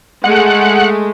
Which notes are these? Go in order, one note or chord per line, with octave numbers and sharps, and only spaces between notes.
G#3 A3 F#5